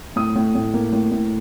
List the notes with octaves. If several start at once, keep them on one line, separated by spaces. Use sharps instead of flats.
A2 D#6
A2
A2
A#3
A2
A2